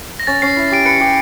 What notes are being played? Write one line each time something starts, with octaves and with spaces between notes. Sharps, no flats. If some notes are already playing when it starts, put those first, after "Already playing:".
A#6
C#4 A6
C#4 C7
E4
G4 D7
B4 C#7
G4